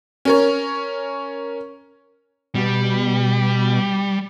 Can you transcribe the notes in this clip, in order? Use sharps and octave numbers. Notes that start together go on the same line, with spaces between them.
C#4 A#4 C#5
B2 G3